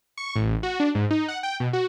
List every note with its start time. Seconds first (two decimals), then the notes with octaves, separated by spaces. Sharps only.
0.17 C#6
0.36 A1
0.63 F#4
0.80 D4
0.95 G#2
1.10 D#4
1.28 F#5
1.43 G5
1.60 B2
1.73 F#4